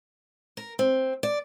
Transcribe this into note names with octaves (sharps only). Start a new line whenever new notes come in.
A#4
C4
D5